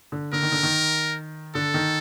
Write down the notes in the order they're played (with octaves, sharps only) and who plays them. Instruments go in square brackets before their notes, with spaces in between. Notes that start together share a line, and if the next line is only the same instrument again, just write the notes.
[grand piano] D3
[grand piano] D3 [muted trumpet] A#4
[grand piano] D#3
D3
D#3
[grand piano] D3 [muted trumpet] A4
[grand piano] D#3